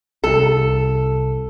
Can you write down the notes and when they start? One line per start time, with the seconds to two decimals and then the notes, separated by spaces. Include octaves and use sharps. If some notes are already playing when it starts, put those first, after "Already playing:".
0.24 C2 A4